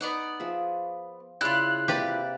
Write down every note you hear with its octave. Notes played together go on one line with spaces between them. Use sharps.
B3 D#4 D5 F#5 A#5
F3 G#4 E5
C#3 E4 F4 G#4 D5 F#6
C3 A#3 G4 B4 D5